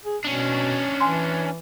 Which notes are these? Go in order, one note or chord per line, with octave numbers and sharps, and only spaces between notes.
G#4
B2 C#4 D4
E3 G#5 C6